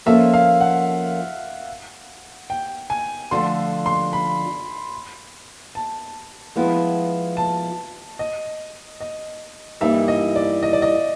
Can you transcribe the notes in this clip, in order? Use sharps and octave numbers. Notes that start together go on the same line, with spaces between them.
F3 A#3 C#4 F4 A4 E5
F5
F#5
G5
G#5
D3 F3 A3 C6
C6
B5
A5
F3 G#3 B3 E4
A5
D#5
D#5
G2 E3 G3 A#3 D#4 E5
D#5
D5
D#5
D5
D#5